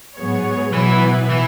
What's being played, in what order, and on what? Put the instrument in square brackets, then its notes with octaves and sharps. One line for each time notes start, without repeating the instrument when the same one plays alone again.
[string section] G#2 F#3 B3 G#4 C#5
[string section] B2 F#3 B3 E4 B4 [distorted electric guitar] E3
[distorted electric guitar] E3